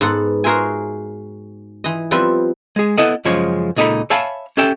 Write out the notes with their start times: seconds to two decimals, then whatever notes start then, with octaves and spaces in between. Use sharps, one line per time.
0.01 G#2 B3 A4 F#5
0.44 F#4 G#4 A#4 C5 E5 G#5
1.84 E3 D#5
2.11 F3 G3 B3 C4 B4 E5
2.76 G#3 G#4
2.98 B3 E4 A4 D#5 F#5
3.25 F#2 C#3 F3 G#3 C#5
3.76 C#2 A#2 D#4 F4 A4 B5
4.10 C#5 E5 F5 G#5 A5 B5
4.57 C#4 G4 A4 E5 G5